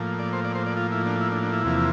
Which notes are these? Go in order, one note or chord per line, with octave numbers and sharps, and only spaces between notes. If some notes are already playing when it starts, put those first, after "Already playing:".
Already playing: A2 F3 A#3
D5
C5
D5
C5
D5
F4
E4
D4
E4
D4
D4
E4
E2 C3 F3 A#3